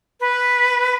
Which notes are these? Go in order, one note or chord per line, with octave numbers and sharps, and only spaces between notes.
B4